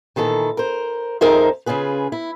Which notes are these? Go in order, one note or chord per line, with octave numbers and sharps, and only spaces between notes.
A#2 D#3 E3 A4
A#4 C5
F2 D#4 G#4 A#4 C5 E5
C#3 C#4 F4 G#4 B4
E4